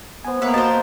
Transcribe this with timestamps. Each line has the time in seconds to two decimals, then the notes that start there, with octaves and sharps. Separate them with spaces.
0.25 B3 C5 G#5
0.42 A#3 B3 B4 C#5 E5
0.54 F#4 A#4 C5 D#5 A5
0.67 G6